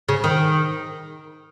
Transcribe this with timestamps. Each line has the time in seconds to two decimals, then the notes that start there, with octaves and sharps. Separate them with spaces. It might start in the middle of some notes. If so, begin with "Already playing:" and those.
0.09 C#3
0.24 D#3